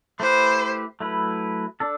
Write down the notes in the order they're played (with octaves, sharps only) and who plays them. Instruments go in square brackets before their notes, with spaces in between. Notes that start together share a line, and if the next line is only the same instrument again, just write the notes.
[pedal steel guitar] A3 E4 G4 B4 [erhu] C5
[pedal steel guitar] F#3 A3 E4 B4
D4 A4